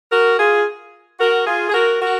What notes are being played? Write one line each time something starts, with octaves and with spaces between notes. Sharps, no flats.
F#4 A#4
F4 G#4
F#4 A#4
F4 G#4
G#4
F#4 A#4
F#4 A#4